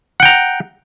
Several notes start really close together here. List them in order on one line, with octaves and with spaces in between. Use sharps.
F#5 G5 A#5